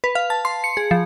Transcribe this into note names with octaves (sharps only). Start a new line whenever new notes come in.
B4
F5
A5
C6
C#7
G#4
F3